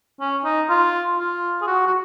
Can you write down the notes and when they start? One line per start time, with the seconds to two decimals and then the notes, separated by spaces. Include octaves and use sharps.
0.20 C#4
0.44 D#4
0.70 F4
1.19 F4
1.62 G#4
1.67 F#4
1.86 F#4